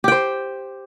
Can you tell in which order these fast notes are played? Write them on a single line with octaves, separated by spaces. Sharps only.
G4 G5 C5